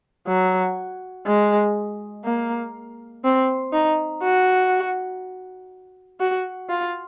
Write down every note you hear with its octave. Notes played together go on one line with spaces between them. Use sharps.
F#3
G#3
A#3
C4
D#4
F#4
F#4
F4